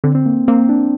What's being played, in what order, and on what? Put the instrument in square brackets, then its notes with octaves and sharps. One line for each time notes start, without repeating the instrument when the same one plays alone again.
[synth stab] D3 [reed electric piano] C4
[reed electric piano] C4
A#3
[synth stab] A#3 [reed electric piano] C4
[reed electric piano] D4